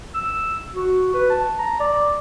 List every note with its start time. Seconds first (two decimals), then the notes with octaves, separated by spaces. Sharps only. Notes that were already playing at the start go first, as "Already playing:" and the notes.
0.14 E6
0.75 F#4
1.14 B4
1.30 A5
1.59 A#5
1.80 D5